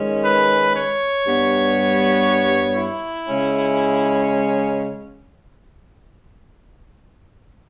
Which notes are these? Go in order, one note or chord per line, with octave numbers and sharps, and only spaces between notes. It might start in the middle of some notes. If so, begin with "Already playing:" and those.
Already playing: D#3 G#3 C#4
B4
C#5
G2 G3 B3
E4
C#3 G#3 C#4